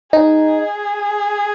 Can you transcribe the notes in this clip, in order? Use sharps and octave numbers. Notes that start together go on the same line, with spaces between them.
D#4 G#4